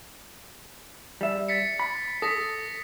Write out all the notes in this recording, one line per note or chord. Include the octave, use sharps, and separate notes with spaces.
G3 E5
A6 B6 C#7
B5
A4 D#6 A#6 B6